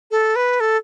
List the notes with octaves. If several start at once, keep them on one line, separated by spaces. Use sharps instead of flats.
A4
B4
A4